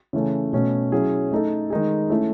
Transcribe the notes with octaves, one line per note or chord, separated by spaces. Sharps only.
C#3 E3 A3 C#4
B2 A3 C#4
F#3 C#4 E4 G#4
A3 D#4 A4
D#3 G#3 D#4 G#4
A3 C#4 E4